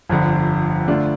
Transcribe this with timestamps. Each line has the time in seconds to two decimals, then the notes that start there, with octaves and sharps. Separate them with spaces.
0.09 G1 F2 D3
0.88 D3 A3 D4 F4